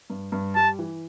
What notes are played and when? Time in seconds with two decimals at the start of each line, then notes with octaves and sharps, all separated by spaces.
0.10 G2
0.32 G2
0.55 G3 A5
0.79 E3